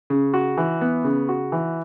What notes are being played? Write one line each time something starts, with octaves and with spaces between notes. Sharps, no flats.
C#3
F#4
E3
B3
C#3
F#4
E3